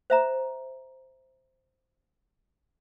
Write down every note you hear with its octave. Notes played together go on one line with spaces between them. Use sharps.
C5 E5 A#5